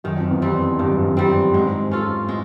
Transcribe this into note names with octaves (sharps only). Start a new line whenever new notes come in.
F#2 D#3
F2
E2
F2 G3 C4
G2 D#3
F#2
F2
F#2
G3 C4
G#2 G#3
C#4 F4 A4
A2 G#3